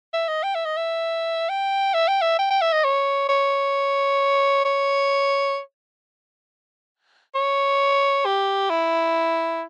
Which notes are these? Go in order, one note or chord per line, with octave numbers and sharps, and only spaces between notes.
E5
D#5
G5
E5
D#5
E5
G5
E5
G5
E5
G5
G5
E5
D#5
C#5
C#5
C#5
C#5
G4
E4